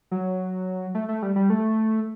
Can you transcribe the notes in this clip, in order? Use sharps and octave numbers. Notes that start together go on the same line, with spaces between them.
F#3
A3
A3
G3
G3
A3